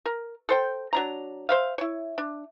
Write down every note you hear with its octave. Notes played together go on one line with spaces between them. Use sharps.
A#4
A4 C5 G5
F#3 D4 A#5
C5 E5 F5
E4 C#5
D4